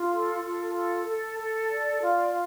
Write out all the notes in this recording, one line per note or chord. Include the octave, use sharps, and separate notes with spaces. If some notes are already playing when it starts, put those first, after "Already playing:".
Already playing: F4
A4
F4
A4
A4
A4
D5
F4